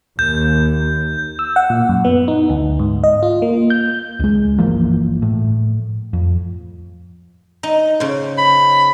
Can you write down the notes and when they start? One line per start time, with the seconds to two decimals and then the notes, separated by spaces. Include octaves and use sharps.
0.19 D#2 G6
1.39 E6
1.56 F#5
1.70 A#2
1.89 F#2
2.05 B3
2.28 D#4
2.50 D2
2.79 G#2
3.04 D#5
3.23 F4
3.42 A#3
3.70 G6
4.20 C#2 G#3
4.59 G1 E3 F3 A#3
5.22 A2
6.13 F2
7.63 D#4
8.00 C#3 C5
8.38 B5